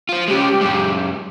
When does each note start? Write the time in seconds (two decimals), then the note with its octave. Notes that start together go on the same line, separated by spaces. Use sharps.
0.09 F4 C5
0.28 G#3 C#4 G4
0.61 F#2 G#3